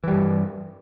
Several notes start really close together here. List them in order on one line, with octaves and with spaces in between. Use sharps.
E3 G3 G2